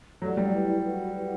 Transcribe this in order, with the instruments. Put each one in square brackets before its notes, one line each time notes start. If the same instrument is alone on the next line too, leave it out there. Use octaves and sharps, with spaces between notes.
[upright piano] F#3 A3 [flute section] C#4 G4 D5 F#5
[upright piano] G3
[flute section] E4 G4 B4 D5
F#4 B4 F#5
E4 G4 B4 F#5